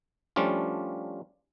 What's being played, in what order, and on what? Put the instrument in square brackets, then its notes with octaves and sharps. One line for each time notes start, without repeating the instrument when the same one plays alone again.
[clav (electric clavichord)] F3 G3 A3 C#4 D4 F4